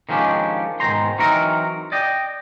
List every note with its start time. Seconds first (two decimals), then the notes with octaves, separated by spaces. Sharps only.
0.09 D#3 F3 G#3 C#4 D4 G4
0.80 G#2 B2 D#3 C5 A#5 C6
1.18 E3 F#3 C4 D#4 F#4 A#4
1.92 D5 D#5 G5